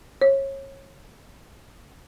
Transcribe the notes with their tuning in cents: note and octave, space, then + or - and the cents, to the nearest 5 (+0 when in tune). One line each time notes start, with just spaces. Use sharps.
C#5 -30